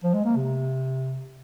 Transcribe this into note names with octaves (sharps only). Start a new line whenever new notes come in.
F3
G#3
A#3
C3